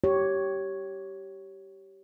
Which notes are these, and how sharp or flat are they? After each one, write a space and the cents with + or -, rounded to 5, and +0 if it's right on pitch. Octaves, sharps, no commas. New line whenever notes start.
G4 -20 C#5 +0